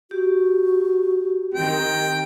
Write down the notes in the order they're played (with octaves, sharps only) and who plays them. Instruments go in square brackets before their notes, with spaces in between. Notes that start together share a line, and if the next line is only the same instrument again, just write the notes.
[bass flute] F#4 [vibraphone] G4
[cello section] D#3 C4 [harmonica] G5